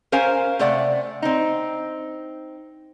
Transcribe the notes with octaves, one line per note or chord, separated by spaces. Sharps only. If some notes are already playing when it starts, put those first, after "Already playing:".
C#4 A#4 C5 F5 G#5
C3 A3 D5 F#5
C4 D#4